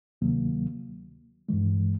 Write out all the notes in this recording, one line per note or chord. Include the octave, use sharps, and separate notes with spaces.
D2 C3 D#3 F#3 A#3
G2 E3 G#3